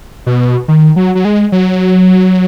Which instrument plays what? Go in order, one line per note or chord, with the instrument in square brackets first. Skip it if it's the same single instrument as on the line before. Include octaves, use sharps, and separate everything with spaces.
[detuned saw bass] B2
D#3
F#3
F#3
G#3
F#3